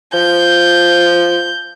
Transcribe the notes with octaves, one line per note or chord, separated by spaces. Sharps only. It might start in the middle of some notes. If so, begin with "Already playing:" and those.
F3 G6